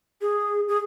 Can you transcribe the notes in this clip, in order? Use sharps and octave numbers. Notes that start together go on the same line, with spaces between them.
G#4
G#4